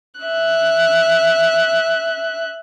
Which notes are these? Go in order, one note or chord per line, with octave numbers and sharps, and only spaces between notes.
E5 F#6